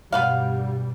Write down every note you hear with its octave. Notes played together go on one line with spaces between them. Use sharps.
G2 B2 G3 B3 B4 F5